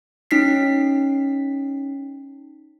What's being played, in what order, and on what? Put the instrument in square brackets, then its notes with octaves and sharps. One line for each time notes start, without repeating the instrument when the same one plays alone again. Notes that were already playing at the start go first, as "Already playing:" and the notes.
[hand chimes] C#4 D#4 B6 C7